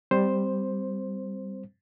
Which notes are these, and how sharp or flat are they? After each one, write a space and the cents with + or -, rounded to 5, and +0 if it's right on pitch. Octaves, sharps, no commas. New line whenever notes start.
G3 +0 C4 -15 C5 +5